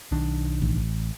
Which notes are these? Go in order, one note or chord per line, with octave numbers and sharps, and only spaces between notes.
B1 D#3 D4
A1